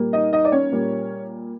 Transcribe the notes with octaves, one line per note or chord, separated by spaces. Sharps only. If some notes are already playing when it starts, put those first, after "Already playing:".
Already playing: A#2 G3 A#3
D#4 D#5
D#4 D#5
D5
C#4 C#5
A#2 G3 A#3